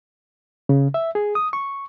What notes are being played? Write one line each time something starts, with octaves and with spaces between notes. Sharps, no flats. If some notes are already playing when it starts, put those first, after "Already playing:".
C#3
E5
G#4
D#6
C#6